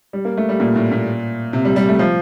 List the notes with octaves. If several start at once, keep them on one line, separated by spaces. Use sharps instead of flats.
G3
A#3
A3
G3
A#2
A2
A#2
C3
G3
G3
A3
F3